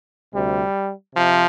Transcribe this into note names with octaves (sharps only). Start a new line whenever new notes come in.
D2 C3 G3
C3 F3